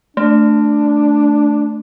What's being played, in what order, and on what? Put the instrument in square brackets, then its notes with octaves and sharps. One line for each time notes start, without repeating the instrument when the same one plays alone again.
[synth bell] A3 [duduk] D4